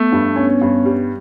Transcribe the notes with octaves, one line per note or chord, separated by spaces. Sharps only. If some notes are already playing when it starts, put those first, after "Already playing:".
Already playing: A3 B3
G2
C#4
G2
G3